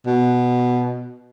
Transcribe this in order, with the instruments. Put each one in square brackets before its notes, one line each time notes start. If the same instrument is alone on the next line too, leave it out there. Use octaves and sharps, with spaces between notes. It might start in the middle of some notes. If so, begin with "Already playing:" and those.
[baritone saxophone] B2